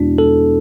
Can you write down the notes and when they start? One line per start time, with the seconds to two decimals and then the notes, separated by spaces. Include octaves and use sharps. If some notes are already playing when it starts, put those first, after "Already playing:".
Already playing: E2 B2 G#3 B3 D4 E4 F#4
0.18 A4